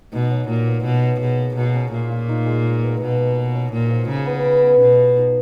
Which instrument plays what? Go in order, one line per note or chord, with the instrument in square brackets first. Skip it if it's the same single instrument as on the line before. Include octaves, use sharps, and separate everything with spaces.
[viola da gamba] B2 [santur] D#4
[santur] F#3
[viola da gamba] A#2 [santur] F#3
[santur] B3
[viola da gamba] B2 [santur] F4
[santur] F#3
[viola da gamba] B2 [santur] G#4
[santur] A#3
[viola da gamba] B2 [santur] A#4
[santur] C#4
[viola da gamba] A#2 [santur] F5
[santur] F4
D#4
G#3
G#3
B3
[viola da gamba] B2 [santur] G#4
[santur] A#3
A#3
C#4
[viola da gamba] A#2 [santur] F#4
[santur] F3
[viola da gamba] C#3 [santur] A#4
[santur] B3
B4
B3
[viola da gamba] B2 [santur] D#5
[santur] F4
D#4